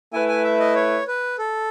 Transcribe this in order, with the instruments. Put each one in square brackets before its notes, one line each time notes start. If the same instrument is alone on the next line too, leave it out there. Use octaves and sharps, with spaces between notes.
[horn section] A3 E4 B4 [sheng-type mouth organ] G#5
[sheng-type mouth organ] G#5
E5
D#5
C#5
B4
A4